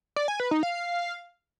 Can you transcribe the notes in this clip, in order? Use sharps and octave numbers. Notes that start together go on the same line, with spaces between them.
D5
G#5
B4
D#4
F5